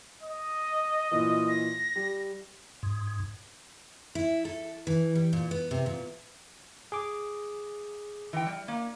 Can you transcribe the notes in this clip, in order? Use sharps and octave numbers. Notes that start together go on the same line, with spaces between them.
D#5
A#2 E3
A#6
G3
G#2
E4
A4
E3
G3
A#2
B3
C3
A#2
G#4 D6
E3 G5
G3
A#3